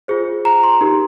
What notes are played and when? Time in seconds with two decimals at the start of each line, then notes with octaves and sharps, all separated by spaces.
0.08 F4 G#4 C5
0.45 A#5
0.63 C6
0.81 D#4 G4 A#4